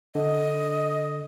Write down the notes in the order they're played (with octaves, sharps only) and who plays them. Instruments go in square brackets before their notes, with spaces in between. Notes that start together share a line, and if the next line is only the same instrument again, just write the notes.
[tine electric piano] D3 [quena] D#5